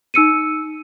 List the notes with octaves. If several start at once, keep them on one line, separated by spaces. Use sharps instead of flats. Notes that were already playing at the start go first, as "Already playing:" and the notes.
D#4 E6 C#7 D#7